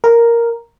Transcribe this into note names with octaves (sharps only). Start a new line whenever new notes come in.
A#4